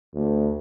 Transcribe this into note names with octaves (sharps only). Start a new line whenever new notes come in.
D2